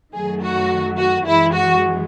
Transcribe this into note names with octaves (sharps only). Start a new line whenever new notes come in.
F#2 D#3 F#3 A3 G#4
F#4
F#4
F#2 E3 G#3 E4
F#4